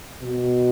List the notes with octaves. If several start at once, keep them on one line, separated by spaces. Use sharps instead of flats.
B2